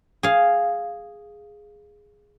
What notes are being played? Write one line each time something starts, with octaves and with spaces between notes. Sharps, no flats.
G#4 F5